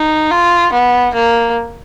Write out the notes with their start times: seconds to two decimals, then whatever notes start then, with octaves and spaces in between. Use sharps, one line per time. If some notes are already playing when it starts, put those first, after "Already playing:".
Already playing: D#4
0.31 F4
0.73 B3
1.15 A#3